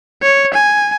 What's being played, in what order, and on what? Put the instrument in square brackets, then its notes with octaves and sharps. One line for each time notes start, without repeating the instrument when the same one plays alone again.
[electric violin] C#5
G#5